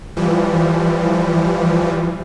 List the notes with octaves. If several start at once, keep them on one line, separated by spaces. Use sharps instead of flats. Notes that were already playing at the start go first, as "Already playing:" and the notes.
E3 F3 G3